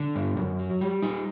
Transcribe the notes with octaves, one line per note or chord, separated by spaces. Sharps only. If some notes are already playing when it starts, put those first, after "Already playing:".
Already playing: D3
G2
F#2
F#3
G3
D#4